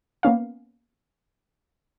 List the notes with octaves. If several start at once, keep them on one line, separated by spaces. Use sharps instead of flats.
A#3 B3 C#4 F5